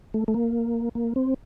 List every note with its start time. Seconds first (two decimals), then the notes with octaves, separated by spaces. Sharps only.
0.14 A3
0.28 A3
0.34 A#3
0.95 A#3
1.16 C4